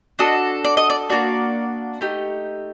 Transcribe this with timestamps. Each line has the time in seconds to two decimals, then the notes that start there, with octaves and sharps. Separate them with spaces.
0.19 D4 F#4 A4 D#5
0.64 D5
0.77 D#5
0.90 D5
1.10 A#3 D4 F#4 D5
2.01 A3 D#4 G4